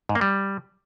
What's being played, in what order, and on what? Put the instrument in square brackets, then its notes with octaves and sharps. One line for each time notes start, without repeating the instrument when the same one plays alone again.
[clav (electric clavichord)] G#2
A#3
G3